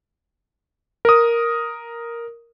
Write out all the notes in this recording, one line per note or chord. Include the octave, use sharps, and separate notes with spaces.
A#4 D#6